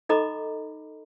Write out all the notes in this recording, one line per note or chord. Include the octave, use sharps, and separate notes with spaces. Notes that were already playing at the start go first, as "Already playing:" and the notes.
D#4 A4 D#5 A#5 B5 D6